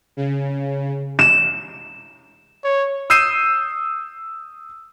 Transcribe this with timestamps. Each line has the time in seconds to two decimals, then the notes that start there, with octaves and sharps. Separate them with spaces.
0.17 C#3
1.19 E7
2.64 C#5
3.10 D#6 E6 G6 C7 D#7 E7